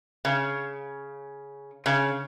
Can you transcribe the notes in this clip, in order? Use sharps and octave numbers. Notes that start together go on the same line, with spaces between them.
C#3
C#3